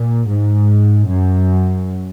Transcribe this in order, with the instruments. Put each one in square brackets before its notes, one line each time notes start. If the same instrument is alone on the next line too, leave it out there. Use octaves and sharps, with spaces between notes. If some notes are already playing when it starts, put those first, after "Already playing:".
Already playing: [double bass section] A#2
G#2
F#2